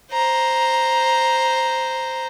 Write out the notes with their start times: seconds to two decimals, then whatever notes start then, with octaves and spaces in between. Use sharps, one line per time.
0.12 C5 A#5